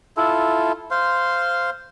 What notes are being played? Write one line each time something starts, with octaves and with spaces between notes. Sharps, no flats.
E4 F4 A4
C5 F5 C6